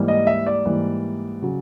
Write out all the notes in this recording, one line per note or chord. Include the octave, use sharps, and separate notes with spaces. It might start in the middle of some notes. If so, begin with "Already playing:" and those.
Already playing: G#2 E3 G3 A#3
D#5
E5
D5
G#2 E3 G3 A#3
C#3 F#3